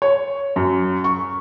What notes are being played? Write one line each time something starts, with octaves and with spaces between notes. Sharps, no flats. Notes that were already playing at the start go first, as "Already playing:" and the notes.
C#5
F#2
C#6